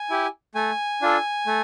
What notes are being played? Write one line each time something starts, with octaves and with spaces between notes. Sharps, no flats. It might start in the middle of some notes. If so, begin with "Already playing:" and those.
Already playing: G#5
E4 G4
A3 G#5
D4 F4 A4
A3